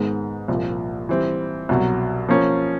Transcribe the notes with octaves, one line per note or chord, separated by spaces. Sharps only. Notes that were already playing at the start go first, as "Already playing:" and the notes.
Already playing: G#2 D#3 G#3 B3
C2 A#2 F3
E3 G3 C4
C2 B2 F#3
F3 A#3 C#4